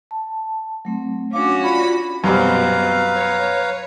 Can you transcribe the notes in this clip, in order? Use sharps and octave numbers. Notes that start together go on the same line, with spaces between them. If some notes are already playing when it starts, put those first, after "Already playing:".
A5
F#3 A3 C4
C#4 D4 F#4 F5 D6
F4 D5 B5
F#2 B2 G3 C4 B4 F5 A#5
C#5